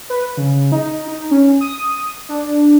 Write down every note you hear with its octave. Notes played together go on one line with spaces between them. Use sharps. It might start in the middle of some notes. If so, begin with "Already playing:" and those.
B4
C#3
D#4
D#4
C#4
D#6
D4